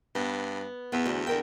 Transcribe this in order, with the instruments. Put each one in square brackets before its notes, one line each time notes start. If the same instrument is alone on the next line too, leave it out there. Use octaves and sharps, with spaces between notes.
[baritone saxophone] G2 [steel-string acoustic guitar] B3
[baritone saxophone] E2 [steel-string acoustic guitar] B3
[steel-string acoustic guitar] D2 D3
D3 A#4 G5